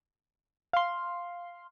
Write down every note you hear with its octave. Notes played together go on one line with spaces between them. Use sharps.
F5 C6